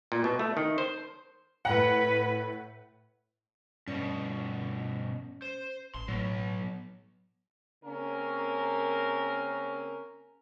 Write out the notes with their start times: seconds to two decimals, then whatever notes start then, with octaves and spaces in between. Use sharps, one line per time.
0.12 A#2
0.24 B2
0.39 A3
0.57 D#3
0.78 C5
1.65 A2 B4 F#5
3.88 G2 B2 C#4
5.42 C5
5.95 A1 C6
6.08 A2 F#3 B3
7.85 C#3 A#3 C4 C#4 A#4